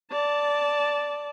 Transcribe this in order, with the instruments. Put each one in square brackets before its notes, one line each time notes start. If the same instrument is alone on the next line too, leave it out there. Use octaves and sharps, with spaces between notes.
[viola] D5 A5